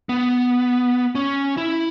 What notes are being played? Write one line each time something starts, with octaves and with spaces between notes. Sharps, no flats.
B3
C#4
E4